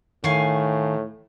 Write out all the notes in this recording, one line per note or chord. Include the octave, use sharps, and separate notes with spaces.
A2 D#3 F5 G#5 C#6